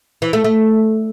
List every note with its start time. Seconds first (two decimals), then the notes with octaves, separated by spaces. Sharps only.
0.22 E3
0.33 A3
0.44 A3